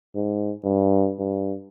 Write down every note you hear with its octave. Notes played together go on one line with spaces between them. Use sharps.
G#2
G2
G2